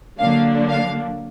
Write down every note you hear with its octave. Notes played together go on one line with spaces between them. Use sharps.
D3 F#3 A#3 D4 F5
F5